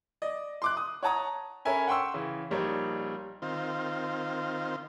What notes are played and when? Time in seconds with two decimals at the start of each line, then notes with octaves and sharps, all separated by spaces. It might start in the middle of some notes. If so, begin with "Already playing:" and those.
0.22 D5 D#5
0.62 C6 D6 F#6
0.77 D#6
1.03 C#5 F#5 A5 A#5 D#6
1.65 C#4 A4 A#4 E5 G#5 B5
1.88 F#5 G5 C6 C#6 E6
2.14 C#3 E3
2.51 A#1 G3 D#4 A#4 C#5
3.42 D#3 C4 F4